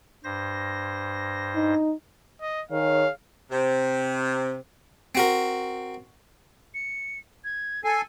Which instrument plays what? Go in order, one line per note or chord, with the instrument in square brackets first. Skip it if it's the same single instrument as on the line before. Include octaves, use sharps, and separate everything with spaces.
[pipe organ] G2 C5 A#6
[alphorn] D#4
[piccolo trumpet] D#5
[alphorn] D#3 [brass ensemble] G#4 C#5 [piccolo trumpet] F5
[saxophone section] C3 [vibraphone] C5
[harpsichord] C4 F#4 A#4
[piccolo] C#7
G#6
[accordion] A4 G#5 [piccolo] C7